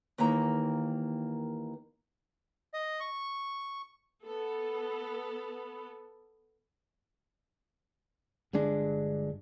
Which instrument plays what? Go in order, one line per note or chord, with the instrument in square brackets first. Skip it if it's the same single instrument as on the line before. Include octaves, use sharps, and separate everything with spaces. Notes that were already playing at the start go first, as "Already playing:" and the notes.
[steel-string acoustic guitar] D#2 D#3 E3 A#3 A#5
[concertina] D#5
C#6
[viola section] B3 A4
[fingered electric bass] G1 G2 G#3 D4